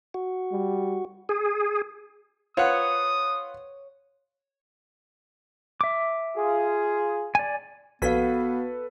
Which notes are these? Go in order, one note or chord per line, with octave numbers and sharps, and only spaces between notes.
F#4
G3
G#4
F4 B4 C#5 F#5 D#6
E5 D6
F4 G#4
D5 G#5
A#1 B3 F#4 A4 B4 F5 B6